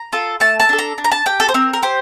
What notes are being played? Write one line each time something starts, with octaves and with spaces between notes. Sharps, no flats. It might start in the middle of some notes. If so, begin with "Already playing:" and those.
Already playing: A#5
F4 A4
A3 A5
A5
D4 A4
A#5
D4
A#5
A5
G4 G5
A4
C5
C4 A#4
A#4
G4 C5